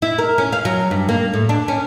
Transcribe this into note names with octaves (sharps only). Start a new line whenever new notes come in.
E4
A#4
C#4
F5
F#3
G2
A#3
A2
D4
C#4